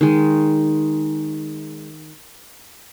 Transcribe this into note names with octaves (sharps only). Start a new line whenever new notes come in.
D#3 G#3